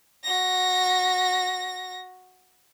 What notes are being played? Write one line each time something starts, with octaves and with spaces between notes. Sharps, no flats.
F#4 A#6